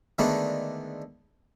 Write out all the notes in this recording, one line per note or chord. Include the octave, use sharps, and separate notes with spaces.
D3 D#3 G#3 A3 B3 D4